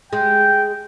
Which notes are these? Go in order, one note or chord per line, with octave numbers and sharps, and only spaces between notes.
G#3 G#4 G5